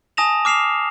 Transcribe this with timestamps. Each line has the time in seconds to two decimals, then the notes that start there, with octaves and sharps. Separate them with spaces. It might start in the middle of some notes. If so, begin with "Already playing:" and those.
0.17 G#5 A5 D#6 A#6 E7 F7
0.45 D6 F6 C7 E7 F7